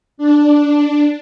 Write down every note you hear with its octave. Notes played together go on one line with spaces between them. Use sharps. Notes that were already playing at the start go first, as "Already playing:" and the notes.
D4